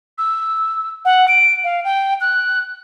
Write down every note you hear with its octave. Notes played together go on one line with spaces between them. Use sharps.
E6
F#5
D7
F5
G5
F#6